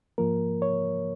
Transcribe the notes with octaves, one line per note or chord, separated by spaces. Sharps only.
G#2 F3 A#3 A#4
C#5